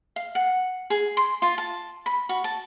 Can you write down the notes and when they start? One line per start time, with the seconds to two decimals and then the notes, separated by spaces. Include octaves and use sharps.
0.16 F5
0.35 F#5
0.90 G#4
1.17 C6
1.42 F4
1.58 A5
2.06 B5
2.29 F#4
2.44 A5